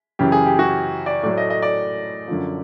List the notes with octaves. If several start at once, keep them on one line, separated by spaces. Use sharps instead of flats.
F#2 C#3 E3 G4
G#4
G4
F#4
D5
A2 F#3 A3 D5
D#5
D#5
D5
F#2 D3 F3